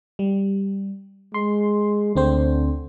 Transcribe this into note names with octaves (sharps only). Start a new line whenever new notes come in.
G3
G#3 C6
D2 D3 C4 C5